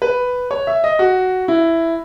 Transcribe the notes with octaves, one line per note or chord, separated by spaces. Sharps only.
B4
C#5
E5
D#5
F#4
E4